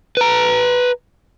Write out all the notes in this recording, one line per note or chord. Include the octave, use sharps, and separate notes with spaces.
B4 A#5